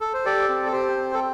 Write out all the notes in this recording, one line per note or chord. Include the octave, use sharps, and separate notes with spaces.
A4
C5
G4 A4 D5
C4
A4
G4 C5
C4
A4